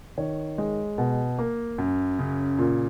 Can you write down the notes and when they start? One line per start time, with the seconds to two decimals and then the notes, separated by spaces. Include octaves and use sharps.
0.18 D#3 C#5
0.58 G#3
0.98 B2
1.39 A#3
1.78 F#2
2.19 C#3
2.58 A#2